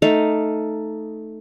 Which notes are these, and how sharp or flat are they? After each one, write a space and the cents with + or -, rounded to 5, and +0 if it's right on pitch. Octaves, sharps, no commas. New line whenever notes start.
A3 +0 D#4 +0 F5 +0